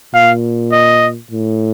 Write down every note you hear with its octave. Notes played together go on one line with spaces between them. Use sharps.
A#2 F5
D#5
A2